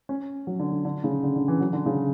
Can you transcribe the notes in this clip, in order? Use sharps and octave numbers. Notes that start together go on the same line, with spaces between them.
C#4
F#3
D3
D3
D3
C#3
D3
D3
E3
F#3
D3
C#3